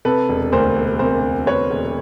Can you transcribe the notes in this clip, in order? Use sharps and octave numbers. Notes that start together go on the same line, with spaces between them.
C3 A4 B4
E1
D2 A#4 C5
E1
C3 A#4 C5
E1
D2 B4 C#5
E1